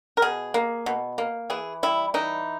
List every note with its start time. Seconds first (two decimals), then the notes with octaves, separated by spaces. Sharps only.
0.17 A#4
0.22 B2 G#4
0.54 A#3
0.86 B2
1.18 A#3
1.50 E3 G#4
1.83 G3 E4
2.14 E3 D#4